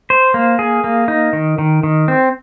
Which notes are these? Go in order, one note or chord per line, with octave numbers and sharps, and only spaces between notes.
C5
A#3
G#4
A#3
D#4
D#3
D#3
D#3
C4